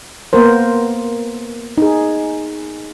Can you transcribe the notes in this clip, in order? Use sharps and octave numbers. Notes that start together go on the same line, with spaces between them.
A#3 B3 A#4 C5
D#4 G#4